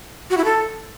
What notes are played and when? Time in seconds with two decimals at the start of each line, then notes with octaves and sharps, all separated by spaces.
0.30 F#4
0.37 E4
0.44 A4